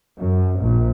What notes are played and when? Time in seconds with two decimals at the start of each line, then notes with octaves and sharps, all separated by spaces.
0.18 F#2
0.60 A#1